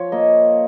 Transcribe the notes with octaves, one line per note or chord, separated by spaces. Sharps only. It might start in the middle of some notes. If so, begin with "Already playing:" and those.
Already playing: F3 C#5
A#3 D#5